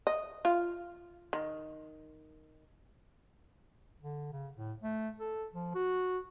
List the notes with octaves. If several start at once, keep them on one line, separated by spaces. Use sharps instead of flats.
D#5
F4
D#3
D3
C#3
A2
A3
A4
F3
F#4